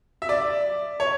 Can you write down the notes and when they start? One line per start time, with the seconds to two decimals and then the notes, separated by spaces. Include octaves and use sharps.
0.22 E5
0.29 D5
1.00 C#5